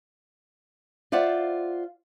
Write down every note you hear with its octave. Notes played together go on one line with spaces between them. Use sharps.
F4 C5 D5 E5 F#5